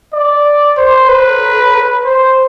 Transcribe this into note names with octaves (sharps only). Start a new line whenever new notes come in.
D5
C5
B4
C5